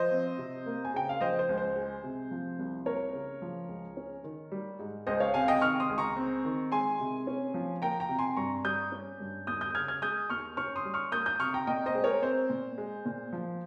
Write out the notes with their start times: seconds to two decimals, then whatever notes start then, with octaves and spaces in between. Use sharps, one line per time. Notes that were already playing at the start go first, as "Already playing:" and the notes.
Already playing: F3 C5 D#5
0.11 C4
0.38 C3
0.66 A#3
0.85 G#5
0.94 C#3 G5
1.09 F5
1.21 F3 C5 D#5
1.39 C5
1.49 C#2
1.58 C5
1.76 G#3
2.04 C3
2.31 F3
2.59 C2
2.86 A#3 A#4 C#5
3.13 C#3
3.42 F3
3.69 C#2
3.97 C#4
4.24 D#3
4.52 G3
4.79 G#2
5.07 C#2 C5 D#5
5.20 C#5 F5
5.34 C3 F5 G#5
5.48 D#5 G5
5.61 D#3 C#6 F6
5.80 C6 D#6
5.89 C#2
5.98 A#5 C#6
6.16 C4
6.45 D#3
6.72 G#3 G#5 C6
7.00 C3
7.27 C#4
7.54 F3
7.82 A#3 G5 A#5
8.00 G5 A#5
8.09 C3
8.19 G#5 C6
8.37 G2 A#5 C#6
8.64 G3 D#6 G6
8.92 C#4
9.20 G2
9.47 D#2 D#6 G6
9.61 D#6 G6
9.75 C#3 F6 G#6
9.88 F6 G#6
10.02 G#3 D#6 G6
10.30 D#2 C#6 F6
10.57 C#4 C#6 F6
10.76 C6 D#6
10.85 G3
10.94 C#6 F6
11.12 A#3 D#6 G6
11.26 D#6 G6
11.40 C3 C#6 F6
11.54 G5 A#5
11.67 A#2 D#5 G5
11.86 C5 D#5
11.95 G#3
12.04 A#4 C#5
12.22 C4 C5
12.50 A#2
12.78 G#3
13.05 A#2
13.33 F3